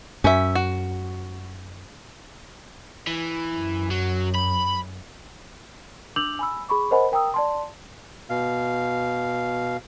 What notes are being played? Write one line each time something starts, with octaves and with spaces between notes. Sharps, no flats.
F#2 C#4 E5
F#4
E3
F#2
F#3
B5
D4 D6 E6 G6 F7 F#7
G#5 B5 E6
G#4 B5 C#6 D6
A#4 C5 D#5 F#5 G#5 B5
A#4 G5 A#5 D#6 E6
D5 A5 C6
B2 F5